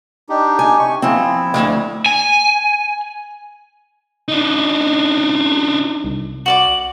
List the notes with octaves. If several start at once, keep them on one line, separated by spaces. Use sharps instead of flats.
D4 D#4 G4
G#5
C3 C#6
F3 C4 E4
D2
G#5
D4 D#4
C2
F#4 D5 D6 F#7